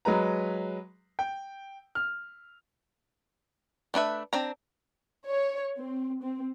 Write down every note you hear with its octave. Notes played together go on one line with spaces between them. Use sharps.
F#3 G#3 B4 A#5
G5
F6
A3 D4 B4 E5
C4 D4 A#5
C#5
C4
C4